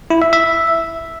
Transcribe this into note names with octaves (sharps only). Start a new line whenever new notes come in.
E4
E5
E5